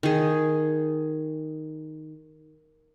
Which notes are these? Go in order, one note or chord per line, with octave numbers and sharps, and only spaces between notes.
D#3 G#4